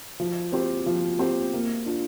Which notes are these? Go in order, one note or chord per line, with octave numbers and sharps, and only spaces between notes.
F3
C4 G4 C5
F3
C4 G4 C5
A#3
D4 F4